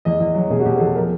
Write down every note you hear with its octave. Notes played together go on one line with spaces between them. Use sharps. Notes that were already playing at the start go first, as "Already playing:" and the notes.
E2 D#5
E2
F#3
B2 G#4
F#4
B2 G4
G#4
E2 A4
F3 A#4